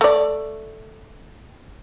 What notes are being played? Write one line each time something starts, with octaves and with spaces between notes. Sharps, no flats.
A3 D5